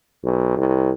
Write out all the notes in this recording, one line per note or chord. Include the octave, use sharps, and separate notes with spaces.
B1
C2